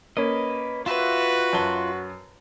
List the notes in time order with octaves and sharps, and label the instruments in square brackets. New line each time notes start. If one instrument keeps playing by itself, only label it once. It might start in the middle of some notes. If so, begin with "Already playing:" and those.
[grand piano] A#3 C#4 [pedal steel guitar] B4 D#5
[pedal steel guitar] F4 E5 [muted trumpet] F#4 [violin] B4
[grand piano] F#2 A5 G7